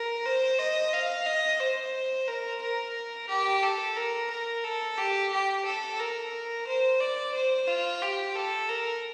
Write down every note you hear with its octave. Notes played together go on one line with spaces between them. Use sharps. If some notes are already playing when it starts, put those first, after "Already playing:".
Already playing: A#4
C5
D#5
F5
D#5
C5
A#4
A#4
G4
A4
A#4
A#4
A4
G4
G4
A4
A#4
C5
D5
C5
F4
G4
A4
A#4